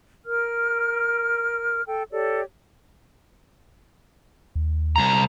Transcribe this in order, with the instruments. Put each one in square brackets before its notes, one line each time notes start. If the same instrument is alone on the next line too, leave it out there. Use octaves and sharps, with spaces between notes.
[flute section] A#4 F6
A4 G5
G4 A4 C#5 D5
[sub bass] D#2
[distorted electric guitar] C2 A#5